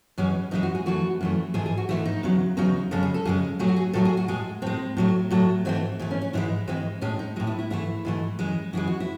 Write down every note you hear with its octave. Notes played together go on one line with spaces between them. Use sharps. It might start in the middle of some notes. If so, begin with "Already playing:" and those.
F#2 E3 G#3 C#4
F#2 E3 G#3 D#4
F#4
G#4
F#2 E3 A3 F#4
F#2 E3 A3
G#2 E3 A3 G#4
G#4
F#4
G#2 E3 A3 E4
D#4
E2 C#3 F#3
E2 C#3 F#3 D#4
F#2 C#3 G#3 A4
G#4
A4
F#2 C#3 G#3 G#4
A2 F#3 A3 G#4
F#4
G#4
A2 F#3 A3 A4
G#4
F#4
A2 G#3 G#4
A2 G#3 C4
A2 F#3 A3
A2 F#3 A3
G#2 E3 A3 C4
G#2 E3 A3
C#4
C#4
G#2 E3 G#3 E4
G#2 E3 G#3 C4
A2 G#3 C#4
D#4
A2 G#3 E4
E4
E4
G#2 E3 A3 E4
G#2 E3 A3
F#2 E3 G#3
F#2 E3 G#3 E4
F#4
E4